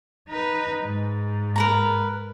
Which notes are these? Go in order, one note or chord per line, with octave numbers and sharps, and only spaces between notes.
D#4 B4
G#2
A#4 B4 A#5